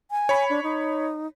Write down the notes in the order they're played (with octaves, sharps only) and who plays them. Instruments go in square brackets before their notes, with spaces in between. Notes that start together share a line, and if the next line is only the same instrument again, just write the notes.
[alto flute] G#5
[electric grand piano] C#5 B5
[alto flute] D4
D#4